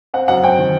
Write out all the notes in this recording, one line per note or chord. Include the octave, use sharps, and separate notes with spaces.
C4 F#5
F#2 F#5
C4 G5
D#3